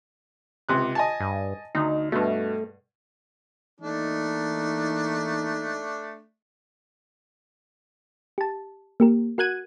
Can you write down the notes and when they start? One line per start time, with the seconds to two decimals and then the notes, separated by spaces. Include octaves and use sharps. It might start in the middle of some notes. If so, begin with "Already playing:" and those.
0.69 C#2 C3 F#6
0.95 D#5 G#5 A5
1.20 G2
1.75 D2 D#4
2.12 G2 B2 A3
3.80 E3 A3 A#3 D4 D#4
8.38 G4 A5
9.00 A#3 G4 A#4
9.38 F#4 A#4 F#5 F#6 G#6 D#7